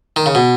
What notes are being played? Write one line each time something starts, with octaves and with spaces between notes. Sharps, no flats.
D#3
C#3
B2